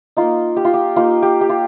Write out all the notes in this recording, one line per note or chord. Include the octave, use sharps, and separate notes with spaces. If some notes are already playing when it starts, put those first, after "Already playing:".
A#3 D#4 F4
G4
F4
G4
A#3 D#4 F4
G4
G4
F4